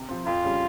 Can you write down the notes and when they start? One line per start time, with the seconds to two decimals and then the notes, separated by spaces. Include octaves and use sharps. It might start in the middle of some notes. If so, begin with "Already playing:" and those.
Already playing: C3
0.09 F3 C4
0.26 F2 F4
0.43 C#3 G3 C#4